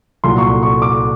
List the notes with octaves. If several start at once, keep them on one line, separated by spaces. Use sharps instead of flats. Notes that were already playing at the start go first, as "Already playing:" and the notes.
C2 A#2 F#3 C6
C#6
C6
C#6
D6